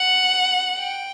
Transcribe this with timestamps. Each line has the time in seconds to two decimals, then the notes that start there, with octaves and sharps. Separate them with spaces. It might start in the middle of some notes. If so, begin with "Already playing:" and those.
Already playing: F#5
0.78 G5